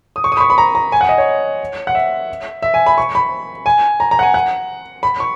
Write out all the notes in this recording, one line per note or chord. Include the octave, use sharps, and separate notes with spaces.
D#6
C#6
D#6
B5
C#6
B5
A#5
A#5
G#5
F#5
D#5
C#5
F#5
E5
E5
G#5
B5
C#6
B5
G#5
A#5
A#5
F#5
G#5
F#5
B5
C#6